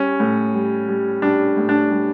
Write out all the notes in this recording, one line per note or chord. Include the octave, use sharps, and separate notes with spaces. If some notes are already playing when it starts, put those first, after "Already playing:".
Already playing: G3 C#4
A2
G3
G3
G3 D4
A2
D4
G3